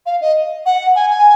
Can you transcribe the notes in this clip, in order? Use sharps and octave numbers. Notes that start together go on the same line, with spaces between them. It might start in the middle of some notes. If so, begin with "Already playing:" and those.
F5
D#5
F#5
G#5
G#5